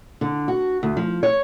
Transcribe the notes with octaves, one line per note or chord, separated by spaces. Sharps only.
D3
F#4
D2
F3
C#5